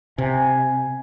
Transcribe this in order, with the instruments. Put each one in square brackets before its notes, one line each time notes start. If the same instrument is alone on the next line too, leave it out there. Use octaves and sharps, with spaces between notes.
[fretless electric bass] C3 [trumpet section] G#5